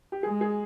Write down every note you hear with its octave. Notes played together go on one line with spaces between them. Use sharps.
G4
G#3 G#4
G#4